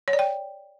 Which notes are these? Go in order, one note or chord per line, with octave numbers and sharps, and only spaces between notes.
C#5
D5
G5